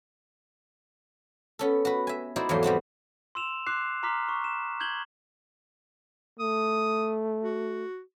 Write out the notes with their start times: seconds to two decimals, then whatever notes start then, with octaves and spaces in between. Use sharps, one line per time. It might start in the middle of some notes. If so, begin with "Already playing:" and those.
1.59 B3 C#4 A4
1.85 F#4 B4
2.07 E5 G#5
2.36 D#4 E4 F#4 C5 D5
2.49 E2 G#2 F3 F#3 A3 C6
2.63 G3 B3 C4 F#4
3.35 C6 E6 E7 F7
3.67 C6 D6 F#6 C7
4.03 A#5 C6 D6 F6 B6
4.28 C#6
4.44 E7
4.80 G6 G#6 F#7 G7
6.40 A3 D#6
7.44 F#4